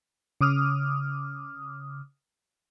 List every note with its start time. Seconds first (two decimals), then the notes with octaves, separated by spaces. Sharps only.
0.41 C#3 D6 D#6 F6